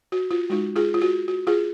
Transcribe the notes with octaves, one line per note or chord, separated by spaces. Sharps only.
F#4
F4
G#3 D#4 F#4
F4 G#4
F4
F#4
F#4
F4 G#4